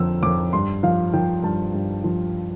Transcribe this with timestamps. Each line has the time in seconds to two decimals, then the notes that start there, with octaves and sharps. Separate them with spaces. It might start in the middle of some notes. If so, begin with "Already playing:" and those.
Already playing: F2 D3 F3 E6
0.23 F2 D6
0.53 G2 C6
0.83 F3 F5
1.13 F3 G5
1.43 G2 A5
1.74 G2
2.04 F3